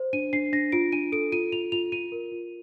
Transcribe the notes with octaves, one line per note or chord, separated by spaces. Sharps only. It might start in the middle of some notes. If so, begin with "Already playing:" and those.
Already playing: C5
D4 D#7
D4 C7
D4 A#6
F4 D7
D4 D#7
A4 D7
F4 D#7
F4 F7
F4 F7
F4 D#7
A#4
F4